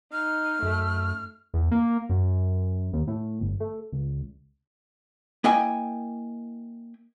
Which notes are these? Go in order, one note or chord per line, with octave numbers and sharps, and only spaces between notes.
D#4 F6
F#2 A3
E2
A#3
F#2
D#2
A2
G1
A3
C#2
A#3 E4 D#5 G5 G#5